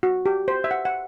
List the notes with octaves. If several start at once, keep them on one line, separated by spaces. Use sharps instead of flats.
F#4
G4
C5
E5
F#5
F#5